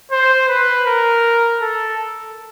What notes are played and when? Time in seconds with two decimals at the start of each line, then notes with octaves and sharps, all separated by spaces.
0.12 C5
0.48 B4
0.87 A#4
1.62 A4